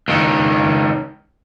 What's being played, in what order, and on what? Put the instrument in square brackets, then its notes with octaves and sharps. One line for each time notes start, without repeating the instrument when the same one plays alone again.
[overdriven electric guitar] C#2 D#3